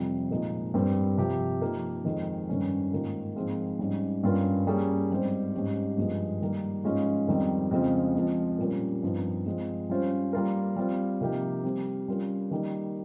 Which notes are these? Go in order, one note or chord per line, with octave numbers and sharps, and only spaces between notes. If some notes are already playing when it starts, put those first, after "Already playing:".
Already playing: F2 C3 G3 C4 F4
A#2 F3 G#3 D#4
G2 G3 C4 G4 A#4
C3 F3 C4 G4
F3 A#3 D#4 A#4
F2 D#3 G#3
G2 D#3 G3 C#4
G#2 D#3 A#3 F4
G#2 F3 C4 F4 G#4
G#2 G3 C#4
G2 G3 C#4 F4 A#4
G3 A#3 C#4 G#4
G#2 G3 C4 G4 C5
G#2 G3 C#4 G4
G2 F3 G#3
D#3 G3 A#3 D#4
G#2 F3 G#3 C#4 F4
F2 D#3 G3 C4 D#4
F2 C#3 G#3 C4 F4
F3 G#3 C4
A#2 G3 C#4 F4 A#4
G2 F3 C4 D#4
F3 G#3 C4 F4
G3 C#4 F4 C5
G3 A#3 F4 A#4
G3 C4 F4
C3 F3 A#3 D#4 G4
G3 C4 G4
G3 C#4 F4 A#4
D#3 G3 A#3 D#4